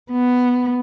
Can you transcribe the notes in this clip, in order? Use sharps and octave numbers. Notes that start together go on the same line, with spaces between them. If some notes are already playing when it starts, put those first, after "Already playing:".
B3